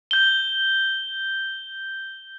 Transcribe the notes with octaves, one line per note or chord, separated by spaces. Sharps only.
G6 G7